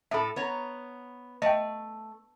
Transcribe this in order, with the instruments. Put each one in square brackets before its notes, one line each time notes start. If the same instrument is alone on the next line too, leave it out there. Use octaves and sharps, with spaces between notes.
[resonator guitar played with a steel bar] A2 A4 [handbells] E5 B5
[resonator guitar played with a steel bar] B3 C#5 A#5
[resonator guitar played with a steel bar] A3 [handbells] D#5 G5